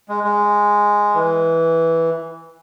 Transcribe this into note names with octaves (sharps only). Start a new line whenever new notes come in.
G#3
G#3
E3